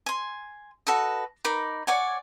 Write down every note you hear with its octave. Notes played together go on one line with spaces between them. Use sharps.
G#5 C6
F#4 A4 B4 D#5
D#4 A#4 B5 D6
C#5 D5 F#5 G#5